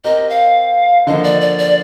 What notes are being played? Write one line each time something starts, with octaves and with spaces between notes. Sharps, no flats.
C4 G4 A#4 D#5
F5
D3 F3 A#3 D#5
D5
D5
D5